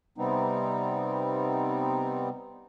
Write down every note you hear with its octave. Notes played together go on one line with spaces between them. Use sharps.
C3 G3 B3 C4 D#4